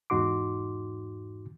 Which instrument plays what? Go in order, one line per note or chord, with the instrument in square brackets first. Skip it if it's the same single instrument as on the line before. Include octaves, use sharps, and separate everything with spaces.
[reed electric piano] E2 G#2 D#4 F#4 C6 D6